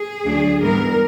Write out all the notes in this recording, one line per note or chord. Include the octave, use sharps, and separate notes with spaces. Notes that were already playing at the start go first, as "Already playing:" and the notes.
Already playing: G#4
D2 D3 F#3 A3 D4
G#2 E3 G3 B3 A#4